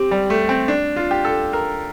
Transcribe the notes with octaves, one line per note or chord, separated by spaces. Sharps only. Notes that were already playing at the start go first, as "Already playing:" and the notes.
Already playing: C4 G4
G3
A3
C4
D4
F4
G4
A4
A#4